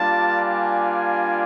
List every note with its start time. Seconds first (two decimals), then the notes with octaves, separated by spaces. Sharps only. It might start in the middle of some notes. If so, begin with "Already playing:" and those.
Already playing: G3 A#3 D4 F4 A5
0.39 G#5